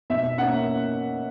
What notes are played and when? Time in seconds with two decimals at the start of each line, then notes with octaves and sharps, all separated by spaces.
0.10 B2 E5
0.38 A#3 C#4 F#5